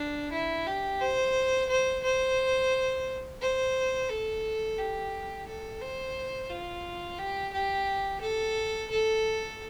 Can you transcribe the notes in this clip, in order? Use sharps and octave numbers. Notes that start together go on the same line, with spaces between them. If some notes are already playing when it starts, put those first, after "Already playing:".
Already playing: D4
E4
G4
C5
C5
C5
C5
A4
G4
A4
C5
F4
G4
G4
A4
A4